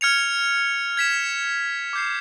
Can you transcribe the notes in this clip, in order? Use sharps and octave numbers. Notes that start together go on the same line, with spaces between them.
F6 G#6 C#7 F7
G#6 B6 E7
D6 G6 C7